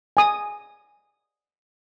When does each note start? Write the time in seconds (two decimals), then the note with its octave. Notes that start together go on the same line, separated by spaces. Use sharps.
0.17 G#5 D#6